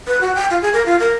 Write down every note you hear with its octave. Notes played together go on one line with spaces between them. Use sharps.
B4
F#4
G5
F4
G#4
A#4
F4
A#4